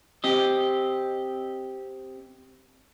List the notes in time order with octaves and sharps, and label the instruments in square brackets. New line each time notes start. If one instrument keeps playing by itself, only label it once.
[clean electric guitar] C4 G4 D#5